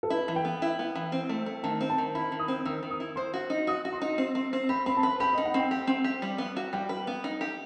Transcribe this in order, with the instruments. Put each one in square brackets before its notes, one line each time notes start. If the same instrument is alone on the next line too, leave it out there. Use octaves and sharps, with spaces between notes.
[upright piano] A4
[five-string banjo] E4 [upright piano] B4
[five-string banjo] E3
[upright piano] G5
[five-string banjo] B3
E4
B3
E3
C4
A3
A3
[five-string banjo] D#3 [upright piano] A5
[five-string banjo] C4
[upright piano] A5
[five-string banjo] D#3
[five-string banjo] E4 [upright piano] B5
[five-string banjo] D#3
[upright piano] D#6
[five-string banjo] C4
[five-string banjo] D#3 [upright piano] E6
[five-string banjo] D#3
[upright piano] D#6
[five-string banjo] E4
[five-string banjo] C5 [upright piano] C6
[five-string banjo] F#4
D#4
[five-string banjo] F#4 [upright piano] D#6
[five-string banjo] F#4
[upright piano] C6
[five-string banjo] D#4
C4
C4
C4
[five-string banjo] G4 [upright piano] B5
[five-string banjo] C4 [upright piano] B5
[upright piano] A5
[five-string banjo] B4 [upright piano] B5
[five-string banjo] G4 [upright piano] B5
[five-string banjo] D#4 [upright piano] D#5
[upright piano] F#5
[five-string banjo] C4 [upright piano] G5
[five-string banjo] G4
C4
G4
G3
B3
F#4
[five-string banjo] G3 [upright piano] G5
[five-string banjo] B4
B3
D#4
G4